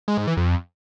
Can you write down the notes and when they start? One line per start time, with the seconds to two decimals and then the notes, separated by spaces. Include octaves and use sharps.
0.08 G#3
0.18 G#2
0.27 E3
0.37 F2